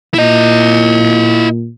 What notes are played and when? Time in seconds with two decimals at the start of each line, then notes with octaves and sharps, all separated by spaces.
0.14 A#2 E4 D#5